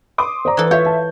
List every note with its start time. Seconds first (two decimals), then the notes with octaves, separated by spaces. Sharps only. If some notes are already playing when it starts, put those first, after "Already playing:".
0.18 C6 D6 D#6
0.45 C5 D5 A#5
0.57 E3 A4
0.71 F4 C#5 E5 G6
0.86 A5